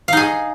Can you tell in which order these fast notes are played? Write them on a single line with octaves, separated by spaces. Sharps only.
F5 D#4 G#4